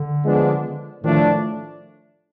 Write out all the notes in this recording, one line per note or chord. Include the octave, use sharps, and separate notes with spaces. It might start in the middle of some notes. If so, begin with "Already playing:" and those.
Already playing: D3
F3 G#3 B3 D4
A2 D#3 F3 A3 D4